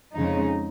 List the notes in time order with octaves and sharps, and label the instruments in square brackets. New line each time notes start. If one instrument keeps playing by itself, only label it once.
[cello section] F2 C#3 G#3 D#4